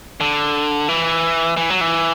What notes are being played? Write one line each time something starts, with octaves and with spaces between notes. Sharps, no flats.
D3
E3
E3
F#3
E3